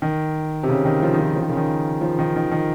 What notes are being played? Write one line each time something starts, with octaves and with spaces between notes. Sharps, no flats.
D#3
C3
C#3
D#3
F3
D#3
F3
F3
D#3
C#3
D#3
F3
D#3
D#3
D#3